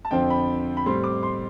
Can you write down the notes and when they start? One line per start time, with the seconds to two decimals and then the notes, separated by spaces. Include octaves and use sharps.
0.05 A5
0.11 F2 D3 F3 C4 G5
0.30 B5
0.77 B5
0.86 A2 G3 C4 C6
1.04 D6
1.23 C6